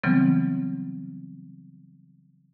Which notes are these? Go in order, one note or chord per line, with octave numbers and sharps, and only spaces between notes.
C#3 E3 F#3 G3 B3 C4